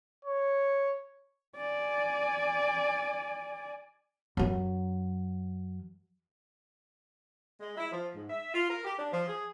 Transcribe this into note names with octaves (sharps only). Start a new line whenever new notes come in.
C#5
D5 G#5
F#2 F#3
G#3
E4
F3
G#2
E5
F4
A#4
G4
D4
F3
G#4